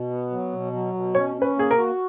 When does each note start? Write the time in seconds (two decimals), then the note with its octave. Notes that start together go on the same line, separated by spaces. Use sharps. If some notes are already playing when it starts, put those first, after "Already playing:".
Already playing: B2
0.10 B3
0.31 F#3
0.52 B2
0.73 F#3
0.94 B2
1.14 C#4 C#5
1.36 C#4
1.42 B4
1.56 A#3 G#4
1.71 A#4
1.77 F#4